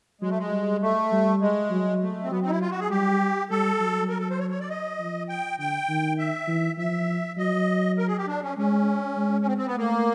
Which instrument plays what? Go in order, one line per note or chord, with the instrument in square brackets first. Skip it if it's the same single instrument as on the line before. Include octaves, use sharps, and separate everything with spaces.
[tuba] F#3 [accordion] G#3
[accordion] A3
G#3
[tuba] G3
[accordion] A3
[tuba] G3
[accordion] G#3
[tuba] F#3
[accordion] A3
C4
[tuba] F#3 [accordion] B3
[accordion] C4
D#4
E4
F4
F#4
G#4
[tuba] G3 [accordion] G4
[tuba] G3 [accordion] A4
[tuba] F#3
[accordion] A#4
A4
C5
C#5
C#5
D5
D#5
[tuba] F3
[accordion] G5
[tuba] D3 [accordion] G5
[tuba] D#3
[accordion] E5
[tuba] E3
[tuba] F3 [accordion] E5
[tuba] F#3 [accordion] D#5
[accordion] A#4
G#4
G4
D4
C#4
[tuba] G#3 [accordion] C#4
[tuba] G#3
[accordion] C#4
C4
C4
B3
[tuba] A3 [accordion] A#3